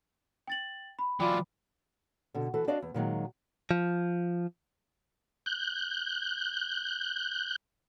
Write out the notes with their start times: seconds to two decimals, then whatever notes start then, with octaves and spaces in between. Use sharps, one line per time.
0.47 G5 A6 F#7
0.99 B5
1.20 E3 F#3 F4 D5 G5 B5 D6
2.34 B2 D3
2.54 E3 F#4 A4
2.67 D4 F#4 D5 D#5 F5
2.82 E2
2.94 A#2 D#3 F#3 G#3
3.71 F3
5.46 F#6 G6